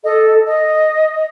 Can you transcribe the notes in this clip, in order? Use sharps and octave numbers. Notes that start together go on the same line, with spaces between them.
A4 D#5
D#5